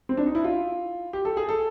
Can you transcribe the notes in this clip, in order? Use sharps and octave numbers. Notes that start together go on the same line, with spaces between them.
C4
D4
D#4
E4
F4
G4
A4
G#4
A4